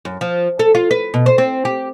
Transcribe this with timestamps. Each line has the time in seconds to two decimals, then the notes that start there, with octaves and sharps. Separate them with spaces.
0.05 F#2
0.21 F3
0.59 A4
0.75 F4
0.91 B4
1.14 B2
1.26 C5
1.38 C4
1.65 G4